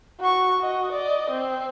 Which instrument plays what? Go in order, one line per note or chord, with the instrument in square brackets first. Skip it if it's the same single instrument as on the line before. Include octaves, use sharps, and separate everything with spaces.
[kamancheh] F#4 C#6
F#4 D#5
D5 D#5
C4